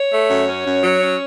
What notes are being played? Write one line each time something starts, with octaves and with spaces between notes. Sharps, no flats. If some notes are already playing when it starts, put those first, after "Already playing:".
Already playing: C#5
A3
F#2
C#4
F#2
F#3
C#4